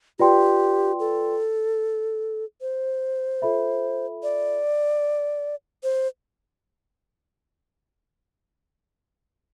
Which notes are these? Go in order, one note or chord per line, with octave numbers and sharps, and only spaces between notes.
F4 G4 B4 D5 G5 C6
A4
C5
F4 A4 E5 B5
D5
C5